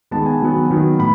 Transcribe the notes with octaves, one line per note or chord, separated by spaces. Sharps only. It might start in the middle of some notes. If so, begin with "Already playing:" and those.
D#3 G#3 B3 A5
G#5
D#3 F#3 B3
D#3 F#3 B3
A2 B5